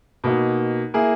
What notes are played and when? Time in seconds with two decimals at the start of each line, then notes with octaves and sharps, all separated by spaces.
0.24 B2 A#3 D#4
0.94 A#3 E4 G#4